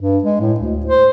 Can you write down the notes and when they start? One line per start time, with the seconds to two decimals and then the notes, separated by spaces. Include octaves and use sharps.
0.01 G2
0.24 G#3
0.41 A2
0.60 D2
0.86 C5